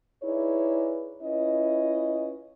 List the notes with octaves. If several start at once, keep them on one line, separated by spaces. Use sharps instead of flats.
D#4 E4 G#4 B4 C#5 D5
C#4 E4 F4 B4 D#5